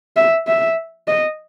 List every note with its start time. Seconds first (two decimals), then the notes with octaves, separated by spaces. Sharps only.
0.17 E5
0.47 E5
1.08 D#5